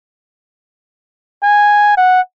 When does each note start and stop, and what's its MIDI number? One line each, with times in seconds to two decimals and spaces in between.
1.43 1.97 80
1.97 2.20 78